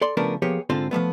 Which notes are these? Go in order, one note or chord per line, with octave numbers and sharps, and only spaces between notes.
A4 D5 C6
C#3 F3 A3 B3 D4 A#4
F3 A#3 B3 G4 G#4 C#5
G#2 D3 C4 F4 A4 C6
F3 G#3 A3 B3